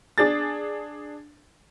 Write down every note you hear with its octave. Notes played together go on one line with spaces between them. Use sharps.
D4 G#4 A6